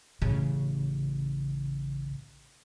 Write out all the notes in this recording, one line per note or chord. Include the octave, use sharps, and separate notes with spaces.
A1 C#3